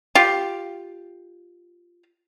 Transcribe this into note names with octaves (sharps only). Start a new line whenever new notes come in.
F4 G4